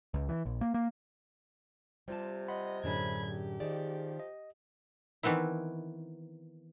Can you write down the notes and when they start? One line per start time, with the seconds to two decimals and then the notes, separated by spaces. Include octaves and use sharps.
0.14 C#2
0.29 E3
0.45 A#1
0.61 A#3
0.74 A#3
2.08 C3 G3 F4 A5
2.48 D#5 F#5 B5 C6
2.84 F#2 A2 D3 F#3 D4 G#4 B5 G#6
3.29 G4
3.60 D#3 F3 G#4 D5 D#5
4.19 D#5
5.23 D#3 E3 B3 C4 E4